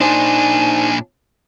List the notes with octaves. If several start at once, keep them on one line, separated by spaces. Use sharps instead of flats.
A#2 D4 D#4 C5 G#5